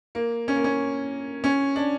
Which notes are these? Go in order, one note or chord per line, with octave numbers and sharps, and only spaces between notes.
A#3
C#4
A#3
C#4
C#4
D4